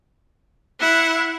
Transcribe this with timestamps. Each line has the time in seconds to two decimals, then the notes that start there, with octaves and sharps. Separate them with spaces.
0.80 E4 F#5